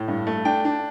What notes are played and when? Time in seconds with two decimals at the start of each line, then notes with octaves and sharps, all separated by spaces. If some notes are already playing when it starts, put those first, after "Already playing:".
Already playing: A2
0.08 G2
0.27 A3
0.45 D4 G5
0.65 D4